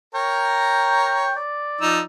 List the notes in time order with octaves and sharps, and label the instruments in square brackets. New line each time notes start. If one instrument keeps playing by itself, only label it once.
[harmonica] A#4 C#5 A#5 [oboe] G5
[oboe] D5
[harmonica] F3 D#4 E6